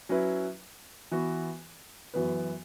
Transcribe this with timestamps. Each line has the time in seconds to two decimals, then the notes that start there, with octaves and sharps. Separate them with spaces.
0.09 F#3 C#4 E4 B4
1.11 E3 B3 F#4 B4
2.14 F#2 E3 B3 F#4 B4